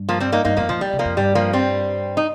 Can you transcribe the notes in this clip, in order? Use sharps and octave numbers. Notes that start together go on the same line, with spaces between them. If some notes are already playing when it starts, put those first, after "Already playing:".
Already playing: G2
F3 A#3
G3 C4
A#3 D#4
G2 A#3 D#4
F2 F3 A#3
A#2 F3
G3
C3
F3 A#3
F2
G2 G3
F3 A#3
G3 C4
D#4